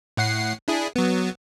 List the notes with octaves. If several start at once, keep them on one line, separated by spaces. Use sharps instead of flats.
A2 F#5 C7
D4 E4 G#4
F#3 B3